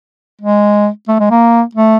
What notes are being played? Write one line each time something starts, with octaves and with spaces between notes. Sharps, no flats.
G#3
A3
G#3
A#3
A3